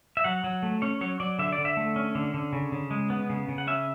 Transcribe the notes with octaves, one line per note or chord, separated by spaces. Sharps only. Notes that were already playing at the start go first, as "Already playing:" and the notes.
E5
F#3 F#5
F#3
A3
C#4 C#5
F#3 C#5
F#3 D5
D3 E5
D5
D3
E5
A3
C#4
D3
D3
C#3
C#3
G#3
B3
C#3
C#3
F#5
C#4 E5